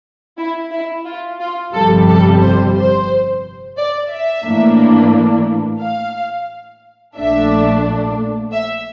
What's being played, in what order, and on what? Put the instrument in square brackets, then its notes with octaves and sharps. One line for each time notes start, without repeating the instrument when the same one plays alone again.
[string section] E4
E4
F4
F4
G1 F2 C3 G3 A4
A4
C5
C5
D5
E5
A2 E3 A#3 D4
F5
A#1 A#2 A3 D4 E5
E5